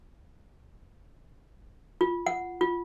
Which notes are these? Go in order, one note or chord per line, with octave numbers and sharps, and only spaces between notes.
F4
F#5
F4